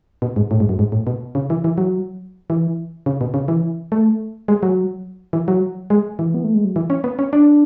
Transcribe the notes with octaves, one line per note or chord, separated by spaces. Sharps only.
B2
G#2
A2
G#2
F#2
G#2
A2
B2
C#3
E3
E3
F#3
E3
C#3
B2
C#3
E3
A3
G#3
F#3
E3
F#3
G#3
E3
B3
A3
G#3
F#3
E3
C#4
B3
C#4
D4